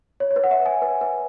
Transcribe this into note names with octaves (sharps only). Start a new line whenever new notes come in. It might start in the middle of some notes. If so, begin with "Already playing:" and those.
C#5
C#5
B4
F#5
E5
G#5
B4
B4